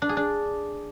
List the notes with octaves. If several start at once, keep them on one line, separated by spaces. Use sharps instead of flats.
D4
G#4
D4